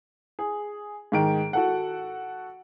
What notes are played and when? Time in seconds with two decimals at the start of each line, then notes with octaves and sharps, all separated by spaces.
0.39 G#4
1.12 G#2 D#3 D7
1.53 F#4 A4 F#5